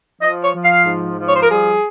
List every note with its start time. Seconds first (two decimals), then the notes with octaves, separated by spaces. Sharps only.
0.21 F3 D#5
0.43 C#5
0.54 F3
0.64 F5
0.85 G#2
1.17 F3
1.28 C#5
1.35 C5
1.42 A#4
1.49 G3 G#4